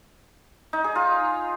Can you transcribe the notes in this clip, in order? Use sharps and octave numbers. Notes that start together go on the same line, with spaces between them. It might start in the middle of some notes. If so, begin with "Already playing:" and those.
D#4
G#4
F4